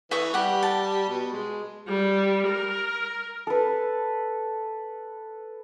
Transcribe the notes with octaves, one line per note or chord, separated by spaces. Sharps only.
E3 E5 C#6 D#6
G3 G4 F#5
A5
B2
G#3
G3
A#4
A4 B4